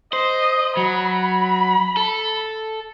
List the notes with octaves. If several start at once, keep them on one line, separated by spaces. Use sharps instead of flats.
C5 D#5
F#3 B5
A4